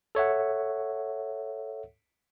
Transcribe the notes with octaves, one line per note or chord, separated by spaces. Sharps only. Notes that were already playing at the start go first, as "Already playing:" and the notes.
A4 C#5 E5 F#5